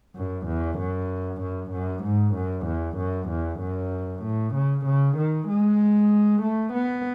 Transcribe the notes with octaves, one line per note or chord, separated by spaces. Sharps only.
F#2
E2
F#2
F#2
F#2
G#2
F#2
E2
F#2
E2
F#2
A2
C#3
C#3
D#3
G#3
A3
B3